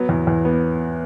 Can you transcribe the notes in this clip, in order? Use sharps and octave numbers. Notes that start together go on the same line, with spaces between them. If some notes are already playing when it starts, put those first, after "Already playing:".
Already playing: F#3 B3
E2
E2
B3